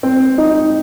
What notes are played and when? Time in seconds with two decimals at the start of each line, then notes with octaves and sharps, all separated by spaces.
0.03 C4
0.38 D#4